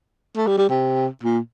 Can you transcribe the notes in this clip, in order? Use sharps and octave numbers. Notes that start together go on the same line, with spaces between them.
A3
G3
G3
C3
A#2